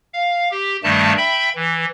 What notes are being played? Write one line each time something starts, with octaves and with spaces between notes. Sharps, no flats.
F5
G4
G2 D#3 G3 A3 A5
E5 G5 B5
E3